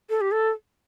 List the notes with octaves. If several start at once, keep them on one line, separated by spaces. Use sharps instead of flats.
A4
G4
A4